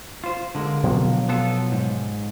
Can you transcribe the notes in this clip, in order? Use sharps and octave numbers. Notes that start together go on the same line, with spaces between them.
F4 C5
D3 G#3 A#3
B2 F3 F#3
B3 F4 A4
G#2